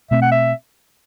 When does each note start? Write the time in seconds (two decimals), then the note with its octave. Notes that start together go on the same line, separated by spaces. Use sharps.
0.11 B2 A3 C4 E5
0.22 F#5
0.32 E5